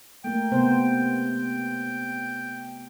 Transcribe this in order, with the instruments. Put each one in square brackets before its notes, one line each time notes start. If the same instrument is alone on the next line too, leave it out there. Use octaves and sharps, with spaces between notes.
[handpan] A3 A#3 [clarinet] G5
[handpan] C3 B3 C5